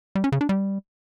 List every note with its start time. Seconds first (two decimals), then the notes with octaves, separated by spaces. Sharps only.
0.15 G3
0.24 C#4
0.32 C#3
0.41 D4
0.49 G3